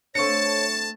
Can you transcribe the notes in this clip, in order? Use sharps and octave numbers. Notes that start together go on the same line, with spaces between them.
A3 C4 D4 C#5 A5 C#6 C#7